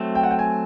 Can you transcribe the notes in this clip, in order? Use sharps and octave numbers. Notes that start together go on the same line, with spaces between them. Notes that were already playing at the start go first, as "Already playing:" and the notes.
Already playing: F#3 A3 C4
G5
F#5
G5
G#5